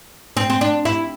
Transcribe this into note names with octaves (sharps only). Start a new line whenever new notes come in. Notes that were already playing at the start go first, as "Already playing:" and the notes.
C4
C4
D4
E4